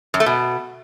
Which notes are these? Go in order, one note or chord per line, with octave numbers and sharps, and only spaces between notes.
F#2
A3
B2